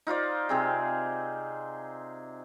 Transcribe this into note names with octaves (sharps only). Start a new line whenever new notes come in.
D#4 F4 C5 D5
C3 C4 G#4